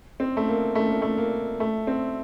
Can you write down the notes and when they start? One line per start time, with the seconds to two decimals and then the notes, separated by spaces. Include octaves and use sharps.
0.20 C4
0.37 A3
0.48 A#3
0.75 A3
0.89 A#3
1.02 A3
1.18 A#3
1.60 A3
1.87 C4